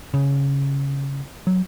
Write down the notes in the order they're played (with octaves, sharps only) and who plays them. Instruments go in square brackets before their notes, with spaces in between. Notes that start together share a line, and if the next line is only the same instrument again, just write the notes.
[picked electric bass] C#3
F#3